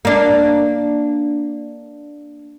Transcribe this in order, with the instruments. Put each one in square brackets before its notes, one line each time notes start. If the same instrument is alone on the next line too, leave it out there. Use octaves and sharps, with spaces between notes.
[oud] A#3 D4